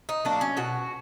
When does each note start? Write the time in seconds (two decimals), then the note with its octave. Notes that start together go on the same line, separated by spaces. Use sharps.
0.09 D#4
0.25 F#3 A#3 D4
0.41 C#4
0.57 B2 F#4